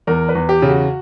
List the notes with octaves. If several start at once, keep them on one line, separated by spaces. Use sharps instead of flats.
E2 A#4
B4
E2
G4
C#3
F#4